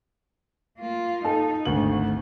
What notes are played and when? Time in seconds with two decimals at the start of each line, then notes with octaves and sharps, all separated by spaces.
0.78 A#3 F4
1.25 D#4 A4 A5
1.65 G#1 D2 A3 F#7